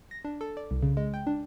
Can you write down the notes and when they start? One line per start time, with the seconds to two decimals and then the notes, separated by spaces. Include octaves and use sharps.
0.11 A#6
0.25 D4
0.41 A4
0.57 D5
0.71 C2
0.83 C#3
0.97 G#3
1.14 G5
1.27 D4